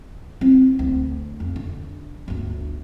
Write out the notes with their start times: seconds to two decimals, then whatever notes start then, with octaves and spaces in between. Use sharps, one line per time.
0.41 C4 E4
0.79 D2
1.40 F2
1.56 D3
2.28 G1 D2